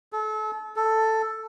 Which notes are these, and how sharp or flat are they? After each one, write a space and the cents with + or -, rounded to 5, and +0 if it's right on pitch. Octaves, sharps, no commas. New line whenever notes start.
A4 -35
A4 +5